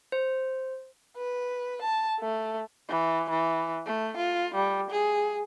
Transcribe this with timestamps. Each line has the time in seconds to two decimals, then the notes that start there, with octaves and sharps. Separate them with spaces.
0.12 C5
1.17 B4
1.82 A5
2.20 A3
2.88 E3
3.29 E3
3.86 A3
4.16 F4
4.54 G3
4.90 G#4